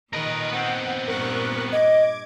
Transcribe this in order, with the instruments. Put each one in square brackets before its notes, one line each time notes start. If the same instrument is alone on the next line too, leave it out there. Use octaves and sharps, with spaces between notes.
[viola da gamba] A#2 D#3 [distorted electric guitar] A#4 B4 [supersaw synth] D#5
[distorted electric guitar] B3 C4 [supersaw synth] F#5
[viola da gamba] G2 A#2 [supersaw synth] A#4 C#6 F#6
[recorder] D#5 [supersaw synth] D6 G#6